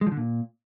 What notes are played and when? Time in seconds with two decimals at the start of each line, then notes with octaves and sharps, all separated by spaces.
0.01 G#3
0.07 F3
0.12 D3
0.17 A#2